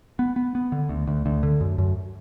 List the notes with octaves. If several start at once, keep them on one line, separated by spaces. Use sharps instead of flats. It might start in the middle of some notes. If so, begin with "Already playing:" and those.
B3
B3
B3
D3
D2
D2
D2
D3
F#2
F#2